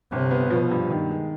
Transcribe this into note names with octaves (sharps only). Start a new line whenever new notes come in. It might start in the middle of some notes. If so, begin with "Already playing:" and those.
G1 C3
B3
B2 F3
G2
D#3
G#3